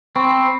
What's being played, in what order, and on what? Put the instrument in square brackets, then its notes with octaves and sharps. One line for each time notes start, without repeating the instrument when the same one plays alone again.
[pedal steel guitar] C4 [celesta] B5 C#6